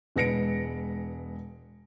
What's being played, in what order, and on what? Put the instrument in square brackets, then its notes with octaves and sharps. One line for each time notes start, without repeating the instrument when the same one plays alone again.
[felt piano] E1 G#3 B4 A#6 C#7 D7